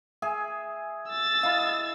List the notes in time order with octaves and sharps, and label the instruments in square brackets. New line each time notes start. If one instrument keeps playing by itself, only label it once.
[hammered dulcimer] G#4 E5 G#5
[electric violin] E6 A6
[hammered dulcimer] E4 D#5 F5